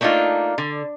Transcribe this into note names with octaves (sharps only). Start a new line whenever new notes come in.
A3 A#3 D4 D#4 F4
D3